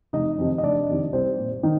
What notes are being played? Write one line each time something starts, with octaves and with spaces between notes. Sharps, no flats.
F1 D#4 D#5
F2 C3 D#3
D#5
F1 D4 D5
F2 C3 D#3
C2 C4 C5
A#2
D#3 D#4